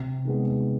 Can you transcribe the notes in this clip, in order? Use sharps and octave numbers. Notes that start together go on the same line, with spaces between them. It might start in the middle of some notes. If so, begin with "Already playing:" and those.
Already playing: C3
D#3 G#3 B3